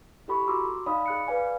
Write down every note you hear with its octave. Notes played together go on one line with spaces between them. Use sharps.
E4 G4 A4 B5 C#6
F#4 A#5 C6 D6 E6
D#4 D5 F5 B5 D#6
G#4 F#6 C#7
B4 D5 F5 G#5